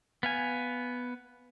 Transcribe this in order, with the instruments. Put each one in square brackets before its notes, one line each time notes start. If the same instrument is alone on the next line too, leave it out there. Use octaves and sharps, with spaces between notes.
[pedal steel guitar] B3 F5 G#5